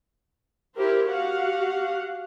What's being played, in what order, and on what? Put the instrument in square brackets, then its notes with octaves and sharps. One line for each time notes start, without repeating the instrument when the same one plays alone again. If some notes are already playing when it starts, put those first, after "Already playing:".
[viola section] E4 G4 A#4 C5
F#4 G4 F5 F#5